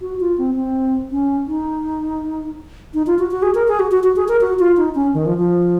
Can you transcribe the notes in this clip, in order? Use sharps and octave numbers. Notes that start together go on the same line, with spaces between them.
F#4
F4
C4
C4
C#4
D#4
D#4
F4
F#4
F#4
G#4
A#4
G#4
F#4
F#4
F#4
G#4
A#4
F#4
F4
D#4
C#4
D#3
F3
F3